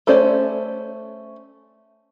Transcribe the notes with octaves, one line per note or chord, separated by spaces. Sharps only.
A3 C#4 C5 D5